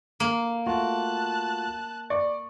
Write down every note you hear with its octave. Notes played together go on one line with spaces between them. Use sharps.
A#3
A3 F4 F#4 A5 F#6
D5 C#6